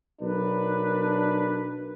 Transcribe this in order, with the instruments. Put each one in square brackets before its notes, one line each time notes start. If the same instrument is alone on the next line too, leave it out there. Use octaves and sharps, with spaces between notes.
[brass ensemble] B1 D4 A#4 B4